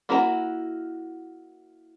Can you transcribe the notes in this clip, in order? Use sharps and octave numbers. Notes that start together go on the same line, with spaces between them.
A#3 E4 F#4 A#4 A#5